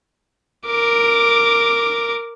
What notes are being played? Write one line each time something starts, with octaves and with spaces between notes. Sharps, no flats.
A#4 D6